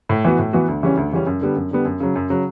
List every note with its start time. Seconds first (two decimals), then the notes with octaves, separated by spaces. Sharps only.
0.09 A2
0.25 E3 B3 F#4
0.39 A2
0.53 E3 B3 F#4
0.68 D2
0.83 C#3 E3 G3 C#4
0.97 D2
1.12 C#3 E3 G3 C#4
1.27 F#2
1.41 D3 G3 B3
1.56 F#2
1.71 D3 G3 B3
1.85 F#2
2.00 C#3 F#3
2.16 F#2
2.30 C#3 F#3